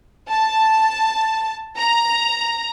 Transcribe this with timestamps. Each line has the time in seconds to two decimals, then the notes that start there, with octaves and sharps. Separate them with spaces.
0.29 A5
1.77 A#5